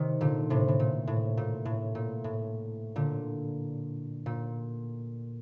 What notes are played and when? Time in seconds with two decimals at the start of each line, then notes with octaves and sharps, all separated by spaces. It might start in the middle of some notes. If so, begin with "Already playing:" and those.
Already playing: C3 D#3
0.21 A#2 D3
0.50 A2 C3
0.68 A2
0.79 A#2
1.07 A2
1.37 A#2
1.65 A2
1.95 A#2
2.24 A2
2.96 A#2 D3
4.26 A#2